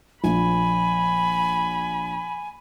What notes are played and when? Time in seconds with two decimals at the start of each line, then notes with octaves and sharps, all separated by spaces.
0.24 A#1 F3 G#5 B5